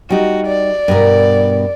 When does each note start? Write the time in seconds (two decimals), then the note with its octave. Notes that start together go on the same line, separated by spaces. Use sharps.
0.10 G3 D#4 F#4
0.47 D5
0.88 G2 B2 A#4